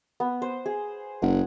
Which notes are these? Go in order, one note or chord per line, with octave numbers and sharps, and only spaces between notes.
B3
C5
G#4
F#1 F#5